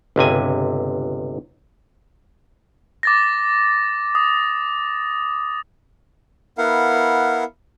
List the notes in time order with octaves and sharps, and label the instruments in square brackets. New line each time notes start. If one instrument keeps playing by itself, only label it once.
[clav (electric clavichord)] G1 C#2 C3 G#5
[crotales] D6 A6 A#6
D#6
[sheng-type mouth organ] B3 E4 A#4 F5 F#5